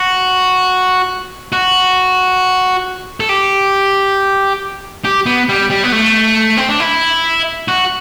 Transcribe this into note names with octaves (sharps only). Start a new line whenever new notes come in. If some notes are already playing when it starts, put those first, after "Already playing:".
Already playing: F#4
F#4
A4
G4
G4
B3
G3
G3
B3
A3
C4
D4
E4
F#4